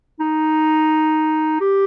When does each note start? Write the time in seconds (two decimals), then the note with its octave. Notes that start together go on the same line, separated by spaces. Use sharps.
0.20 D#4
1.61 G4